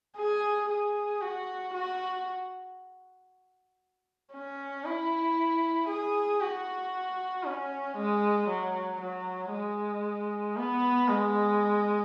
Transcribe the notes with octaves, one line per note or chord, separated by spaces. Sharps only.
G#4
G#4
F#4
F#4
C#4
E4
G#4
F#4
C#4
G#3
F#3
F#3
G#3
B3
G#3